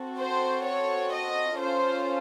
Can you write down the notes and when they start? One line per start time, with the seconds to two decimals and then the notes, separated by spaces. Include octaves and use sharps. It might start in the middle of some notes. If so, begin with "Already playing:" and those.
Already playing: C4 F#4 A4
0.18 C5
0.64 C#5
1.12 D#5
1.59 C#4 F4 A4 C5